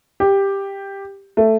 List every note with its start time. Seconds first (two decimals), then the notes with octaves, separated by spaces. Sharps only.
0.20 G4
1.37 A3